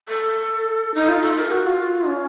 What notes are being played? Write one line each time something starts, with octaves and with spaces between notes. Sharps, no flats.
A4
D#4
F4
A4
A#4
F#4
F4
C#4